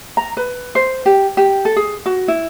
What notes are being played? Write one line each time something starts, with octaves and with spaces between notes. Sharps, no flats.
A#5
B4
C5
G4
G4
A4
G#4
F#4
E4